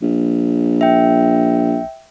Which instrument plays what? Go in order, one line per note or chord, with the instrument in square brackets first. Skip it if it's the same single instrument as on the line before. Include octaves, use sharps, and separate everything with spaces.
[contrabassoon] A#1
[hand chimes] E5 G5